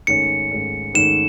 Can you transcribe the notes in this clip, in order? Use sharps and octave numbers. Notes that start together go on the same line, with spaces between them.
G#2 D#3 A3 C#4 C#7
G#2 D#3 A3 C#4
G#2 D#3 A3 C#4 E7